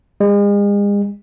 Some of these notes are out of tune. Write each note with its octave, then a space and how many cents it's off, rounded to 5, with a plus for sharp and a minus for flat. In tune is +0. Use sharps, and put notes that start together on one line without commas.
G#3 -40